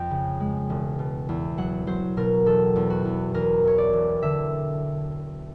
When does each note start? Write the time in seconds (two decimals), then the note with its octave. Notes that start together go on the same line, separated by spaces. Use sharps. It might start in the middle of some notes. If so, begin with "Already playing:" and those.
Already playing: F2 G5
0.11 C#3
0.40 G#3
0.70 E1
0.99 B2
1.29 E2
1.58 F#3 F#5
1.87 F#3 C5
2.17 B2 A#4
2.46 E1 A4
2.76 E2
2.90 F#4
3.05 E2
3.34 E2 A#4
3.64 E2 C#5
3.78 D5
3.93 E1
4.22 D3 E5